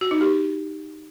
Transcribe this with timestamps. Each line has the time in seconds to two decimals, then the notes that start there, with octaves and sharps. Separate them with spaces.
0.01 F#4
0.11 D#4
0.21 G4